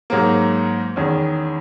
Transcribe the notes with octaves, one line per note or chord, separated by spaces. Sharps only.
G#2 F#3 A#3
E2 D#3 G#3 C#4